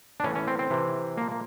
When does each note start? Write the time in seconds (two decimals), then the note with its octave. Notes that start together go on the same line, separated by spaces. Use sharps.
0.20 D4
0.24 A2 E3 C#4
0.35 C#4
0.47 C4
0.59 C4
0.70 C3 E3
1.17 A#2 F3 A#3
1.31 A#3